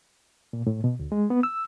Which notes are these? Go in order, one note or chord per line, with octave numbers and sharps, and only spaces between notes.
A#2
A2
B2
D2
G#3
B3
E6